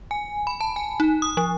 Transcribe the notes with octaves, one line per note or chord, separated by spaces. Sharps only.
G#5
B5
A5
G#5
D#4
D#6
F3